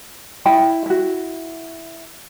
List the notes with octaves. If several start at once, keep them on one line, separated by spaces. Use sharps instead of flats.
E4 G5 B5
E4 F#4